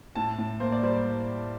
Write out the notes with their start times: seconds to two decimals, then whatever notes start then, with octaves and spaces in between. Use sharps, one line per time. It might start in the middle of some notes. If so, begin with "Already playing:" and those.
0.15 A2 A5
0.38 A2
0.60 A#3 C5
0.72 D5
0.83 G3 C5